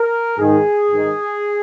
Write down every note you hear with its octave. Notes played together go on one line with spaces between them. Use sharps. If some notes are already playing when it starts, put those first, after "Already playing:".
Already playing: A#4
G#2 D#3 G#4
G#2 D#3